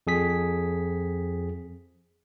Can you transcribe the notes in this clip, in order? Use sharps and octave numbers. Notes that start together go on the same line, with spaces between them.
F2 G#4 B6